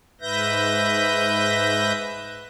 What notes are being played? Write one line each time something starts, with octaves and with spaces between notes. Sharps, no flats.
G#2 B4 E5 G6 A#6